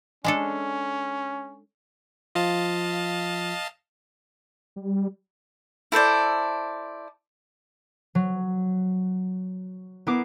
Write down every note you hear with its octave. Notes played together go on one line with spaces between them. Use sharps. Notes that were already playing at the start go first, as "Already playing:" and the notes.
G#3 C#4 D4 A4
F3 F4 D#5 F5 A5
G3
E4 A4 C5 D5
F#3
B3 E4 A#4 D6 C7